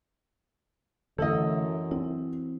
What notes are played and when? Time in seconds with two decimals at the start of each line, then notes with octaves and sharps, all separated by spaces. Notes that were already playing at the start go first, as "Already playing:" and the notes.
1.18 F#2 D3 E3 A3 E4 A4 D#5 F#5
1.91 C4 E4